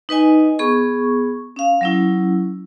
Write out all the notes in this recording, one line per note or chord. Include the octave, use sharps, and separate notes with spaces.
D#4 B4 D#5 G#5
B3 G#4 C#6
C#4 F5
F#3 C#4 E4